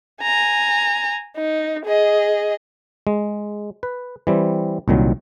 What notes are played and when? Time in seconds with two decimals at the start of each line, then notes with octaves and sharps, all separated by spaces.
0.22 G#5 A#5
1.37 D#4
1.85 G#4 D#5
3.07 G#3
3.83 B4
4.27 E3 G3 C4
4.88 C2 A#2 D#3 F#3